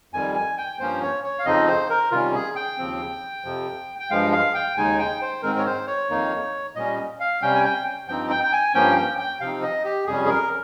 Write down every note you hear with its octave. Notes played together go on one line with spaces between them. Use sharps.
F2 D#3 G3 G#5
G#5
G5
G2 F3 A#3 C#4 C5
C#5
C#5
F5
F2 C#3 F3 C4 D#4 D#5
C5
A#4
C3 D#3 G3 C#4 F4
G#4
G5
D#2 C#3 F3 C4
F2 C3 F3
G5
G2 F3 G#3 F5
F5
G5
D#2 C#3 G#3 D#4 G#5
G5
C5
G#2 D#3 G#3 C4 A#4
C#5
C5
C#5
F2 D#3 A#3 D#4
A#2 G3 C#4 D#5
F5
C3 G3 C#4 G5
G#5
G5
G2 F3 C4 D#4 G5
G5
G5
G#5
G2 F3 A#3 C#4 G5
G5
G5
C3 F3 C4 D#4 F5
D#5
G4
F2 C3 G3 C#4 G#4
G#4
A#4